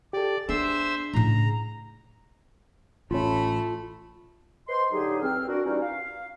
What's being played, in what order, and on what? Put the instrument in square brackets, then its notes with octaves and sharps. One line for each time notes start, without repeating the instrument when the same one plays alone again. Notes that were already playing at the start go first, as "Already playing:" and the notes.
[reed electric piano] G4 A4 [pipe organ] D5
[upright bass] B3 [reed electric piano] D4 G#4 [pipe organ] C5 E5 E6
[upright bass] A2 C#3 [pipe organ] A#5
[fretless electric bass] A1 C#4 [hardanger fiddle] A3 B5 [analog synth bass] F4
[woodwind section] B4 C5 D#5 C6
A2 D3 F#3 D#4 G4 G#4
E2 C4 F6
D4 F#4 A#4
E3 G3 C#4 D#4 F4 F#4
F5